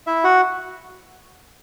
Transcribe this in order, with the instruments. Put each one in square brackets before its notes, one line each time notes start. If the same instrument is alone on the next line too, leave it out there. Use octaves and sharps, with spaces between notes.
[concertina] E4 E5
F#4 F#5